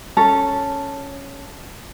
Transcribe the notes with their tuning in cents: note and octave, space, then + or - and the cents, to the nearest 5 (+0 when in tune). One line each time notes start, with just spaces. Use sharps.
C#4 +0 A4 +0 A#5 -15